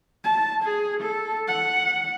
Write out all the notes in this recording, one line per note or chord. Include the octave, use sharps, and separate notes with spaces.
A5
G#4
A4
F#5